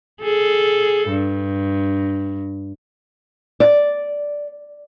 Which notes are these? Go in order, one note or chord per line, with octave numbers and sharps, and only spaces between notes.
G#4 A4
G2
D5